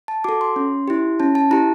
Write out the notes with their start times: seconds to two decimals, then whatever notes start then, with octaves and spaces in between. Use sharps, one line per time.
0.08 A5
0.24 F#4 A4 D6
0.41 C6
0.56 C#4
0.88 E4 G4
1.20 C#4 A5
1.35 A5
1.51 E4 G4 A#5